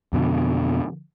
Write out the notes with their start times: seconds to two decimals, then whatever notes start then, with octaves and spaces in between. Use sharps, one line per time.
0.13 F2 B2 D3